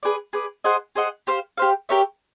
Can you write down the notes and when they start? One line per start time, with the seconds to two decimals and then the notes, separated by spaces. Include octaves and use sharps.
0.03 G#4 B4 D5
0.33 G#4 B4 D5
0.64 G#4 C5 D#5 F#5
0.96 G#4 C5 D#5 F#5
1.27 G4 C5 F5
1.58 G4 C5 F5
1.89 G4 A#4 C#5 E5